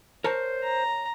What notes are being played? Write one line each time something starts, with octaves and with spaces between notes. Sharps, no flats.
A#4 C5 C#5 A5
A#5